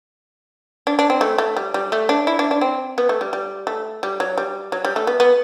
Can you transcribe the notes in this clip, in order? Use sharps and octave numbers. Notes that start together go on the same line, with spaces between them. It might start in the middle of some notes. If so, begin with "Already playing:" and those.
D4
D4
C4
A3
A3
G3
G3
A3
D4
E4
D4
D4
C4
B3
A3
G3
G3
A3
G3
F#3
G3
F#3
G3
A3
B3
B3